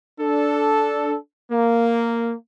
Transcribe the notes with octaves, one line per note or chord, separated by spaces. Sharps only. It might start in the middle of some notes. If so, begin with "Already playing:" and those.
D4 A4
A#3